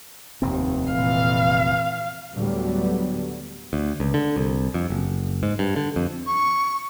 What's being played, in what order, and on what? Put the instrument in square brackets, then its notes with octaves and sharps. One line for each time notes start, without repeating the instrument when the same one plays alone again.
[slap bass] F1 A2 C4 [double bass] D#2
[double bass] A#2 E3 [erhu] F5
[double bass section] D2 A2 D3 F#3 G3 B3
[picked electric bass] D2
C#2
D3
C2
F2
F#1
G#2
G2
D3
F2
[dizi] C#6